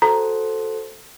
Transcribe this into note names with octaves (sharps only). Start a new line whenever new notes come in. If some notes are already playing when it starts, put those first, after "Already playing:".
F#4 A4 C5 A#5